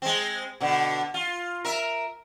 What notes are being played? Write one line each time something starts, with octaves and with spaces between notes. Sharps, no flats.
G#3 C4
B2 D3
F4
A#4 E5